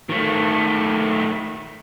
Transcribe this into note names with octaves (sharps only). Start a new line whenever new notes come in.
D#3 A3